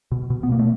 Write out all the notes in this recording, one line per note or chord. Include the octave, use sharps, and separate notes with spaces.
B2
B2
B3
B2 A#3
A3